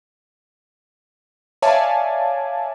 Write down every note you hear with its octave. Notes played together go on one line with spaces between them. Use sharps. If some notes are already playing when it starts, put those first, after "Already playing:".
C#5 D5 E5 F5 G#5 A5